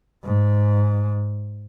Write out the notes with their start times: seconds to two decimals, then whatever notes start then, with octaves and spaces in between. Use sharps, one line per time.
0.24 G#2